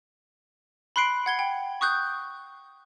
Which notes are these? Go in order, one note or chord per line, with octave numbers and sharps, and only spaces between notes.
B5 C6 F#6 C7 D7
F#5 G#6 G7
G5
C#6 D#6 F#6 G6